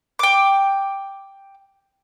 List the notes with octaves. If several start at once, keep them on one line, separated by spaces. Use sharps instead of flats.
G5 D6